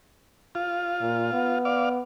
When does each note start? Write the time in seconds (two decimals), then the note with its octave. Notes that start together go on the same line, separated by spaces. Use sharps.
0.55 F4
1.00 A#2
1.33 B3
1.65 D5 F5